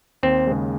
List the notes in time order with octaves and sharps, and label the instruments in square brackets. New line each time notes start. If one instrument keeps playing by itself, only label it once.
[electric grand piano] D#2 [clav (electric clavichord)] C4
[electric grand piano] C#3 G#3